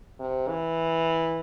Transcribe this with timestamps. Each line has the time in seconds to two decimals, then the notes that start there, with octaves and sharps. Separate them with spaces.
0.19 C3
0.48 E3